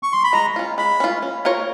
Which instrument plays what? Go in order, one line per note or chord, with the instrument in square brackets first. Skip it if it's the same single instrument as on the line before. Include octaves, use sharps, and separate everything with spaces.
[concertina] C#6
C6
B5
[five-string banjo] G#3 [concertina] A#5
[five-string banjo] C#4 F4
[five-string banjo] G#3 [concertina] B5
[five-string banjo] C#4 F4
C#4
F4 A#4 C#5